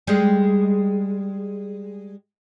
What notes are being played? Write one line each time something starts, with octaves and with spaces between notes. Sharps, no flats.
G3 G#3